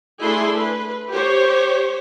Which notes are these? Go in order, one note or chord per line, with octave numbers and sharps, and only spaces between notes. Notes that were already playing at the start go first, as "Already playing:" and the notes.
A3 D4 E4 G#4 C6
B4
G4 C5 C#5